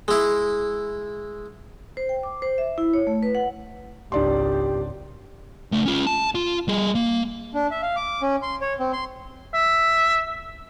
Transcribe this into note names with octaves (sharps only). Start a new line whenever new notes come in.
G#3 E4
C5
G5
D6
C5
E5
E4
C#5
A3
B4
F#5
G#1 C#2 D4 G4 D5 C6
C#2 A3
C#4 F4
A5
F4
G3 G#4
A#3
D4
E5
F5
D6
C#4
C6
C#5
C4
C6
E5